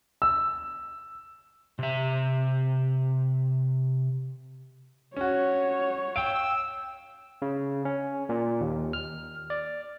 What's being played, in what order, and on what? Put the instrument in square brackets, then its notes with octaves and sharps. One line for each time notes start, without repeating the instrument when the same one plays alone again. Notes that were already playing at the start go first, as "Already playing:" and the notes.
[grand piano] E6
[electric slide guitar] C3 E5
[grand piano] C#4 F#4 [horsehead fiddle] C#5
[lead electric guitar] F5 G5 [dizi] E6 [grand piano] D7
[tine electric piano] C#3
C#4
A#2
D#2
F6
D5